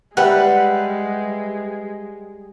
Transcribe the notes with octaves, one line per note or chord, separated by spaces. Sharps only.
G3 G#3 G4 B4 E5 F#5